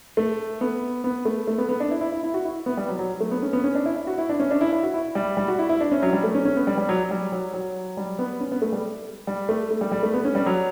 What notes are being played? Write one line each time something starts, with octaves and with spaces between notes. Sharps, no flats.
A3
B3
B3
A3
A3
B3
B3
D4
E4
E4
E4
E4
F#4
E4
B3
G3
F#3
F#3
A3
B3
C#4
B3
C#4
D4
E4
E4
F#4
E4
D4
C#4
D4
E4
E4
F#4
E4
G3
G3
F#4
E4
E4
D4
C#4
F#3
G3
A3
C#4
C#4
B3
G3
G3
F#3
G3
F#3
F#3
G3
B3
C#4
B3
A3
G3
G3
A3
A3
G3
G3
A3
B3
C#4
G3
F#3